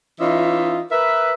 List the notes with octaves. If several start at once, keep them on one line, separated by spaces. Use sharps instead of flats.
E3 C#4 D#4 F4 D#5 E5
A#4 B4 E5